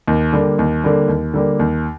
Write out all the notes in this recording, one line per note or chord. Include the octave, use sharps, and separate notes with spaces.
D#2
D3 G3 A#3
D#2
D3 G3 A#3
D#2
D3 G3 A#3
D#2